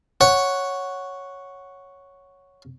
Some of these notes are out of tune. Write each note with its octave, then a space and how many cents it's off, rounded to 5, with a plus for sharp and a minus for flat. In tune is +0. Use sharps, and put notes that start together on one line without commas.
C#5 +0 F#5 +0